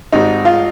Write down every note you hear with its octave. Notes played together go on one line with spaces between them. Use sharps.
G#1 G#2 G3 D#4
F4